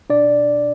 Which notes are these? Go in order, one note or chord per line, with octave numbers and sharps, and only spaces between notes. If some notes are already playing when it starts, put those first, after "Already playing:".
B2 D4 D5